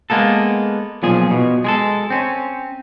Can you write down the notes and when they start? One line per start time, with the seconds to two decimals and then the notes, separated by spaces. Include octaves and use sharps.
0.10 G#3 A#3 B3 A4
1.03 B1 A#2 F3 G#4
1.31 B2
1.64 G#3 G#4 A4
2.10 C4 C#4